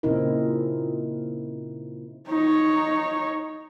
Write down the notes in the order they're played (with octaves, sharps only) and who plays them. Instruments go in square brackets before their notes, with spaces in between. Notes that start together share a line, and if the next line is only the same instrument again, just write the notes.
[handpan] A#2 C#3 C4 D#4 E4 A#4
[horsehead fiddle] D#4 C#5